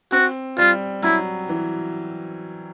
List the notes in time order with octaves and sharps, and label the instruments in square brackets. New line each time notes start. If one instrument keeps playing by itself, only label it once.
[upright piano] C4 [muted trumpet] F#4
[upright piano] G3 [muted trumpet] F4
[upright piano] F#3 [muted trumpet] E4
[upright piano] E3